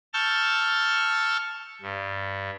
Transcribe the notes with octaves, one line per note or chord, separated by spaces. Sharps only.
A5 C#6 E6 F6 G6 A6
G2